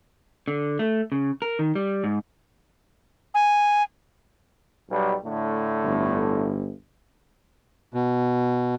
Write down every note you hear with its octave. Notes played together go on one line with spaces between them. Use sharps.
D3
A3
C#3
A#4
D#3
G3
G#2
G#5
B1 G3
A2 D3 A3
G1
B2